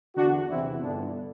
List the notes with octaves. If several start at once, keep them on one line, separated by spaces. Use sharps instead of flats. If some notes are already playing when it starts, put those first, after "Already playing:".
E2 D3 D4 F#4
E2 C3 E3 C4 E4
G1 G2 D3 B3 D4